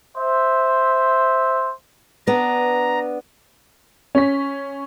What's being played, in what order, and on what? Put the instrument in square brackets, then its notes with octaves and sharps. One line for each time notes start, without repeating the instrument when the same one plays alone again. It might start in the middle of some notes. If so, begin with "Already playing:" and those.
[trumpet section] C5 E5
[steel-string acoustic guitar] B3 D4 [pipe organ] A#5
[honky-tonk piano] C#4 B6